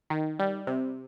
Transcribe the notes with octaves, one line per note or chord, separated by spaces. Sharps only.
D#3
G3
C3